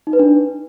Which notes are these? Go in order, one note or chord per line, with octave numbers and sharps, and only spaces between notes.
D#4
B4
D4